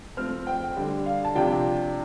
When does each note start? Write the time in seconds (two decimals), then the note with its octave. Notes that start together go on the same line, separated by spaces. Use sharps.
0.17 F3 A3 C4 F6
0.47 G5
0.77 D3 G3 D4
1.06 F5
1.25 A5
1.35 C3 F3 D4 G5